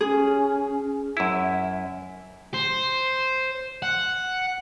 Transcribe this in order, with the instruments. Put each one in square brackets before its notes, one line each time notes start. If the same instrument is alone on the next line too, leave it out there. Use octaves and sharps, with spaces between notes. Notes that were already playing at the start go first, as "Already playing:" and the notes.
[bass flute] C#4 [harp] G#4
[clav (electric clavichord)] F#2 E4
[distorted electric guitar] C5
F#5